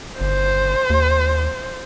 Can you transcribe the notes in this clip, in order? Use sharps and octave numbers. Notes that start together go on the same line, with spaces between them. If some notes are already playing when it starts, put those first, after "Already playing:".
G1 C5
D#2